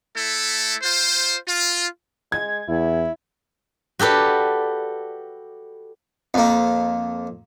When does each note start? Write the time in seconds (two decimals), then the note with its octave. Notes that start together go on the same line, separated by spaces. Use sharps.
0.15 A3 E4 A4
0.82 F4 C5
1.46 F4
2.32 G#3 G#6
2.68 E2 E4
3.99 F#4 G4 A4 B4 D5
6.34 F2 A#3